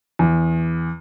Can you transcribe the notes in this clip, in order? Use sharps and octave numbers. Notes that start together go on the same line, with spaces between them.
E2